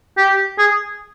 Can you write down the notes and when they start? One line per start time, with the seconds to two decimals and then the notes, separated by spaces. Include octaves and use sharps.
0.17 G4
0.58 G#4